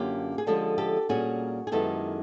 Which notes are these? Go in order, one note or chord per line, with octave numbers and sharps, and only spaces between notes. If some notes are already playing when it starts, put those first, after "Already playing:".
Already playing: F#2 D3 A#3 C#4 F4 G4
G#4
D3 F3 G#3 C#4 G4 A4
G4 A4
A#2 G3 A#3 C#4 F#4 G#4
G#4
F#2 D#3 G#3 B3 E4 G4 A4